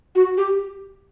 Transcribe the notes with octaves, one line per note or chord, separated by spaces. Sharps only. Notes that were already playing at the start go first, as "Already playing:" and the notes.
F#4
G4